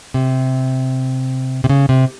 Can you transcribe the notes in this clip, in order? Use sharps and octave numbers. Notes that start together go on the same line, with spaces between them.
C3
C3
C#3
C3